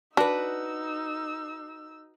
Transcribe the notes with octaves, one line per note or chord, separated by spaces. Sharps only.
D4 D#4 F#4 B4 E6